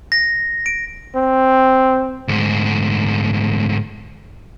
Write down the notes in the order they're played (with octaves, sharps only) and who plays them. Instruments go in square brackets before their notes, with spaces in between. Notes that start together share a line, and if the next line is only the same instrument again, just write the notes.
[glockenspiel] A#6
D7
[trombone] C4
[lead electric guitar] D2 G#2